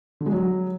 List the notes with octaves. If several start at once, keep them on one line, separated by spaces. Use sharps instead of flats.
D3
G#3
F#3